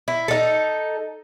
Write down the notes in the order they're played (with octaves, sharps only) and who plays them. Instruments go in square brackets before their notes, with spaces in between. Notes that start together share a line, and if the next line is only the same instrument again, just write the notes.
[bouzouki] E4
D#4 A4